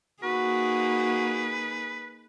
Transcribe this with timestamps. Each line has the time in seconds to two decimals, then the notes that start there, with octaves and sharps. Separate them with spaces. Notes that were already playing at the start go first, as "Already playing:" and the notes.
0.23 A#3 D#4 F#4 G#4 B4